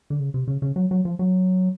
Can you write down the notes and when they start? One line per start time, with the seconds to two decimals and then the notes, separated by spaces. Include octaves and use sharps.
0.10 D3
0.20 C#3
0.34 C3
0.48 C#3
0.62 C#3
0.76 F#3
0.91 F#3
1.05 F3
1.19 F#3